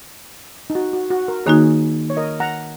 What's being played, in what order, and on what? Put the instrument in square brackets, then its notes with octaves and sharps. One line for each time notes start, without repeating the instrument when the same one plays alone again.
[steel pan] D#4
F#4
F#4
F#4
A#4
[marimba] D#3 A#3 D#4 F#4 [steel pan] G#4 C#5
[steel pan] C#5
A#4 D#5
F#5 A#5